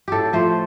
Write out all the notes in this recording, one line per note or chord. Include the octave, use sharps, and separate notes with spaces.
A2 G4 A4
F3 A3 C5